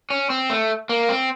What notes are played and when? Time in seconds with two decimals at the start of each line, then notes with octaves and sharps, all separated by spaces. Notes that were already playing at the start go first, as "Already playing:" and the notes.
0.10 C#4
0.30 C4
0.50 A3
0.89 A#3
1.09 C4